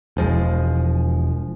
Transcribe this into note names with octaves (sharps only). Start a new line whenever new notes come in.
E1 F3 G#3